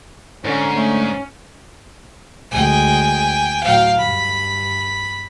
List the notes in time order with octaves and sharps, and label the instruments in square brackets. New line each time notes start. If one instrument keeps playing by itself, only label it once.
[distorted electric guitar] G#2 [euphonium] D3 [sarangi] C#4
[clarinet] A3 [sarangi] C#4
[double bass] D2 G#3 [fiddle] G5 G#5
[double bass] A2 F#3 [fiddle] F5 G5
[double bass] G2 [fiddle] B5